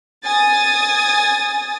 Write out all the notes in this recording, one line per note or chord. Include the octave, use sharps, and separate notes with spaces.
G#5 D#6 A6